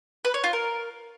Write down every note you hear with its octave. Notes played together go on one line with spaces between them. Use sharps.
B4
C#5
F4
A#4